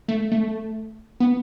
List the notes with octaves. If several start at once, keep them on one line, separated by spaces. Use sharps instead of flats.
A3
A3
B3